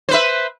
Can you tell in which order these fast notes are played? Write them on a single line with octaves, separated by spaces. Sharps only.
C5 B4 E5